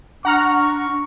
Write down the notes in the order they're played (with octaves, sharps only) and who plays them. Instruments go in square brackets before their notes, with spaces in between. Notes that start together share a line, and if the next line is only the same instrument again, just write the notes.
[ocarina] D4 [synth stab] F#5 A#5 F6 [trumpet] C#6